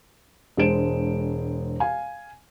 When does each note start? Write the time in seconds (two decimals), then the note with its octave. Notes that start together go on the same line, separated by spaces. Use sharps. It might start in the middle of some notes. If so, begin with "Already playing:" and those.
0.57 E1 G#3 D4 C5 D7 E7
1.80 F5 G#5